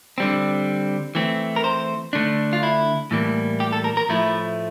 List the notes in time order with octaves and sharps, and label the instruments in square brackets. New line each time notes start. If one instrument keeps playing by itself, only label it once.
[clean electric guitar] D3 G3 C4
E3 A3 C4
A#4
C5
D3 A3 D4
F4
E4
A2 E3 G3 A#3
G4
A4
A#4
A#4
A2 F3 A3 E4